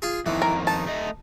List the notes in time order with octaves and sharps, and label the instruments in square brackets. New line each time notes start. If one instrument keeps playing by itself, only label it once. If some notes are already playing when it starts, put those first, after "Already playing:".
[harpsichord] F4 G#4
[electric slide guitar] F2 D#3 [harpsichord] E3
[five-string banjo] A#4
[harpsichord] D#4 [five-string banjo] A5
[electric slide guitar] A3 D#5